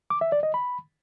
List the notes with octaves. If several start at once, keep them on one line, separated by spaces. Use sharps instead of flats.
D6
E5
D5
D#5
B5